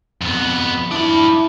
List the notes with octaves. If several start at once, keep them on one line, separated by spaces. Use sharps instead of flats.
F2 B3
D4 E4 B5